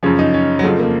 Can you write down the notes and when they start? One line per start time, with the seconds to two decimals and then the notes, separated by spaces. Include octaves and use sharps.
0.03 F#2 C#3 F3 C#4
0.19 D#4
0.34 C#4
0.59 F#3
0.63 F2 C#3 F3 A3
0.80 A#3